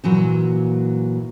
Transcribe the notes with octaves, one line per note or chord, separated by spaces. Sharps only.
A#2 E3 F#3